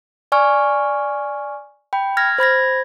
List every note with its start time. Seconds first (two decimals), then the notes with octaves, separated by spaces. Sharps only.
0.32 D5 G#5 C#6 F6
1.93 G5 B5
2.17 F6 G#6 A#6
2.38 C5 B5 G#6 A#6